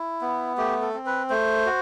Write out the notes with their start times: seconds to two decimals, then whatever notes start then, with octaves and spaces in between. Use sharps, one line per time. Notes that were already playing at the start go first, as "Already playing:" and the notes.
Already playing: E4
0.21 B3
0.58 A3 G4
0.82 A4
0.94 C4
1.06 B4
1.30 A3 C5
1.66 F#4